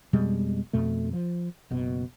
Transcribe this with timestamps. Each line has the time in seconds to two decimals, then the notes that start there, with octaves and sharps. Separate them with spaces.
0.13 F2 B2 G3 G#3
0.73 F2 B2 A3
1.13 F3
1.70 F#1 B2